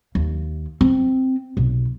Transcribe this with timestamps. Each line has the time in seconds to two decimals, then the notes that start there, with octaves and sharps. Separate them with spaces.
0.15 D#2
0.81 C4
1.57 B1